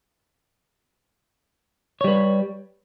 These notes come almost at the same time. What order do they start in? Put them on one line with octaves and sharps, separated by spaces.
C#5 G3 B4